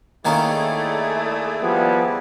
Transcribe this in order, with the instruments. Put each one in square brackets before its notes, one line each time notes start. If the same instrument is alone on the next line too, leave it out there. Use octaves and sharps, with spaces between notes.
[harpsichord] D#3 A#3 C#4 [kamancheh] A3 [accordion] E4 G#4 D5
[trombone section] F3 G3 B3